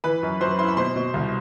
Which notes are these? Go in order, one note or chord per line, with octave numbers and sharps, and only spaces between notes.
E3 B4 B5
F#2
F#2 C5 C6
E4 C6
B5
B2 C5 C6
B2
C2